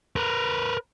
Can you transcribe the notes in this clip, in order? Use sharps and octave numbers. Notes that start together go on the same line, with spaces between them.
A#4 B4